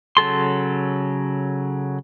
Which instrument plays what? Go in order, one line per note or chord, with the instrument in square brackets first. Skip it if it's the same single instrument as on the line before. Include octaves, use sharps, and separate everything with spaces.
[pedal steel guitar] C#3 F#3 A4 C6